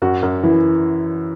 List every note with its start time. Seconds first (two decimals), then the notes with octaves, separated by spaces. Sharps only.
0.02 F#2 F#4
0.23 F#2
0.43 E3 E4